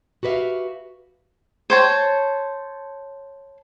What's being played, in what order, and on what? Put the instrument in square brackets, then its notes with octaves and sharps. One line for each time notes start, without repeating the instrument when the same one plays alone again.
[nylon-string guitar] F#4 G4 B4 D5 E5 F5
[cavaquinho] C5 C#5 A5